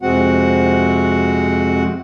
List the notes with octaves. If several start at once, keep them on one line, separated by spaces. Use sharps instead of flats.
F2 C3 G#3 C4 F#4 F#5